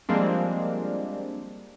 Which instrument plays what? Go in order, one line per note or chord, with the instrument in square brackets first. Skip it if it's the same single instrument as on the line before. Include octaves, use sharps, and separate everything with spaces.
[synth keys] F3 G3 G#3 A#3 C4 D4